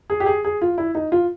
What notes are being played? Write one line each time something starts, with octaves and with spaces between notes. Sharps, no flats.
G#4
G4
G#4
G#4
F4
E4
D#4
F4